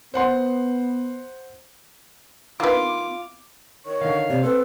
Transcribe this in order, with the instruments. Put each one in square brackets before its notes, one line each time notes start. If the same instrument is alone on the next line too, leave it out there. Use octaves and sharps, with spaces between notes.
[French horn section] B3 [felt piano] C5 F#5 C6
[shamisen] D#3 B4 [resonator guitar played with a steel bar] F4 [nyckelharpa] D6
[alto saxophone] D#3 [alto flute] C#5 [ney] C#6
[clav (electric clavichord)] D3 D#3 [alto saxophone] F5
[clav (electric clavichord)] C3 [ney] D5
[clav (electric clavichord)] C4 [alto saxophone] A4 [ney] B4